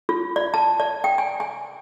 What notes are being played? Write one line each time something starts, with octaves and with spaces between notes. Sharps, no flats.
F4
D5
A5
D5
G5
G#5
G#5